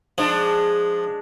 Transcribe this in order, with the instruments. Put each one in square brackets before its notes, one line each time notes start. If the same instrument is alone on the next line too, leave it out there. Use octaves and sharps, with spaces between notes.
[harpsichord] F3 [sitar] G#3 D4